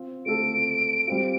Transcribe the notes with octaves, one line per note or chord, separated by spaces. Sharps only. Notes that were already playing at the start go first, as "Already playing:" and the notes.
Already playing: C4 F4
A3 C4 F4 A4 D7
G3 C4 F4